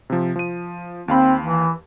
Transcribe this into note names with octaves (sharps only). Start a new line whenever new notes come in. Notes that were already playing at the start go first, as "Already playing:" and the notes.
C3 F3
F3 D#7
D#2 C4 F5 B5
E3